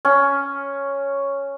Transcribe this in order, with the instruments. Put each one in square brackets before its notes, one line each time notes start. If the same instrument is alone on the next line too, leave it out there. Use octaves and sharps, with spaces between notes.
[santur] C#4